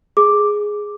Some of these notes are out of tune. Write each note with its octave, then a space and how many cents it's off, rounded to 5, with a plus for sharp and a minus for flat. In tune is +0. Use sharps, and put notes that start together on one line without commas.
G#4 +0 D6 +0